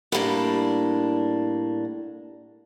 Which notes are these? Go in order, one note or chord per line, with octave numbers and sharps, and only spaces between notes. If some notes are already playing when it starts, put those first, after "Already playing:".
A2 G3 A#3 D4